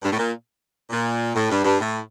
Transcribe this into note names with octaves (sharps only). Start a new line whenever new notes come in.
G2
A2
A#2
A#2
A2
G2
G2
A2